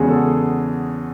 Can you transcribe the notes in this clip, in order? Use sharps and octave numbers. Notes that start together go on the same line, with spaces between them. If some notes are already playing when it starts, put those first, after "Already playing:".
Already playing: E2 C#3 G#3 F#4 G#4
A4